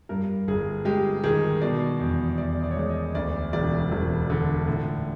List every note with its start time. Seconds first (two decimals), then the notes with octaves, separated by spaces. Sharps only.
0.09 G2 A#4
0.48 G1 G#4
0.85 G#3 G4
1.24 D#3 G#4
1.61 B2 D5
2.00 E2
2.38 E2 D5
2.64 D5
2.71 C#5
2.76 G#3 D5
2.90 D#5
3.15 D2 D5
3.53 E1 D5
3.92 E1
4.30 D3
4.68 A2